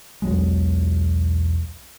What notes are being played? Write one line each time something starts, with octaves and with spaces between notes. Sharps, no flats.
B1 E2 F#3 G#3